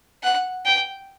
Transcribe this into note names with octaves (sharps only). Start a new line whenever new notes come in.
F#5
G5